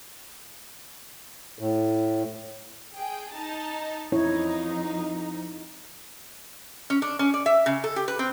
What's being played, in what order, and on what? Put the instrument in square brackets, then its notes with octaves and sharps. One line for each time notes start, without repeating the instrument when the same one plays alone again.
[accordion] A2
[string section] G#4 G5
D#4 A5
[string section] F2 D#4 [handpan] E4 C#5
[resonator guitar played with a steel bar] C#4
D4
C#4
D5
E5
C#3
A4
G4
B4
C4